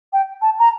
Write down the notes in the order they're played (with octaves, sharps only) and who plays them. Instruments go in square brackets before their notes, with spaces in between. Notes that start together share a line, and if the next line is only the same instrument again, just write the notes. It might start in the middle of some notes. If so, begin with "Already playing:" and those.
[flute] G5
A5
A#5